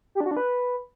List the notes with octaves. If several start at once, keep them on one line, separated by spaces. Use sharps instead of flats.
G4
D4
F#4
D4
B4